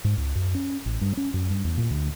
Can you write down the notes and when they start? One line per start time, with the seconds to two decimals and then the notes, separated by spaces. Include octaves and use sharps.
0.04 G#2
0.17 C#2
0.35 F#2
0.55 C#4
0.86 A1
1.01 G2
1.17 C#4
1.34 F#2
1.50 G2
1.64 E2
1.78 A#2
1.91 D2